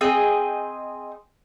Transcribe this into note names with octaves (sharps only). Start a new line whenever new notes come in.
C4 G#4 D#5 G5